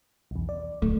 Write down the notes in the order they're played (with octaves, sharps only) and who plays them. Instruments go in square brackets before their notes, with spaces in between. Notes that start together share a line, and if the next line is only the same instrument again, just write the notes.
[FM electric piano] B1 E2
D5
[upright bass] D1 [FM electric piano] A3